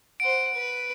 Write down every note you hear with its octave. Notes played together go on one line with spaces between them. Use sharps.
C5 F#5 D7
B4